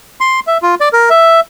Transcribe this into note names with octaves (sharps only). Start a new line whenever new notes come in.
C6
E5
F4
D5
A#4
E5